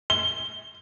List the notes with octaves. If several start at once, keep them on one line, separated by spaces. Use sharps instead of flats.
G7